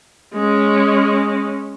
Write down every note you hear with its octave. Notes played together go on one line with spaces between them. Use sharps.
G#3 C#4